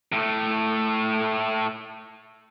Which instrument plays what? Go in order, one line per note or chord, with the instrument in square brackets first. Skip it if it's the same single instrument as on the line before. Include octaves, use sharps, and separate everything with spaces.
[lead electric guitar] A2 A3